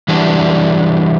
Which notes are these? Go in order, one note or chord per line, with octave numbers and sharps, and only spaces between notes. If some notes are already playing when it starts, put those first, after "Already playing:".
E3 G3 D4 F#4